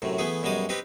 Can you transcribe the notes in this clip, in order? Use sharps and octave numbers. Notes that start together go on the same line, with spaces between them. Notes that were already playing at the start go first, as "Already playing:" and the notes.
F#2 A2 C3
E3 A3 B3 G#4
F#2 B2 G3 G#3 A5 D#6
C4 D#4 G4 B4